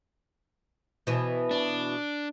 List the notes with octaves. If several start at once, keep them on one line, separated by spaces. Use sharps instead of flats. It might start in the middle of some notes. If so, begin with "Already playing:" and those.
B2 E3
D4